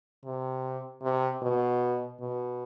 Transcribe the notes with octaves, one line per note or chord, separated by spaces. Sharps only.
C3
C3
B2
B2